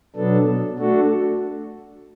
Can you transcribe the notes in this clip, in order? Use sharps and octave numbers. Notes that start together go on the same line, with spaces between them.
B2 F#3 B3 D4 A4
A3 D4 F#4 A4